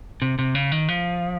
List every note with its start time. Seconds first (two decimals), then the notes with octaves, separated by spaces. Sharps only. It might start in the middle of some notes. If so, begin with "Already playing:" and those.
0.22 C3
0.39 C3
0.55 C#3
0.72 D#3
0.89 F3